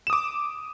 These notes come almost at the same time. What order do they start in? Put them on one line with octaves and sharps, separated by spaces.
E7 D#6 D6